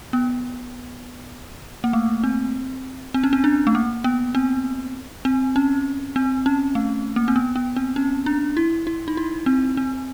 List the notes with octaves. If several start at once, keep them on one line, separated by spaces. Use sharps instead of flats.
B3
A#3
A3
C4
C4
C#4
C4
D4
A3
A#3
B3
C4
C4
C#4
C4
C#4
A3
A#3
C4
B3
B3
C4
C#4
D4
E4
E4
D#4
E4
C4
C4